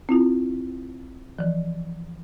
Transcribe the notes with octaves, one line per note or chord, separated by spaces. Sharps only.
C4 E4 F4
E3 F3